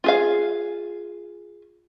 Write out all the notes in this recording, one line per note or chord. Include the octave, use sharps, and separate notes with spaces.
F4 G#4 F5